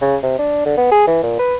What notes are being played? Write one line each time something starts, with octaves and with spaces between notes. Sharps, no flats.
C#3
C3
D4
D3
B3
G#4
E3
A#2
B4